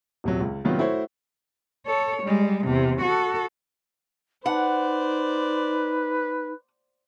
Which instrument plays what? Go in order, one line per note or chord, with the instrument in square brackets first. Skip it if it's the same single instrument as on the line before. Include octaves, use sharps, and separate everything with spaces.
[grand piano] D#1 C3 F#3
C#2
A2 C3 D#3 F#3 B3 F4
A3 E4 F#4 C5 C#5
[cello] A4 C#5
G3 G#3
E2 C3
F#4 A4
[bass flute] D#4 [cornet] B4 [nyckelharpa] C5 D5 [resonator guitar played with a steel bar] F#5